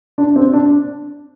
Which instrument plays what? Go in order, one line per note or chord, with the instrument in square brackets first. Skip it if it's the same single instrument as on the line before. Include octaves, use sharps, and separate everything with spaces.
[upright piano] D4
C4
D4